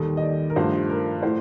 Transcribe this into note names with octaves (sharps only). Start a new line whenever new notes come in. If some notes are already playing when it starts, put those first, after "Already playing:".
Already playing: D#2 D#3 G3 A4
D#5
D5
A#4
G2 F3 A3 C5
A#4
A2 A3 C5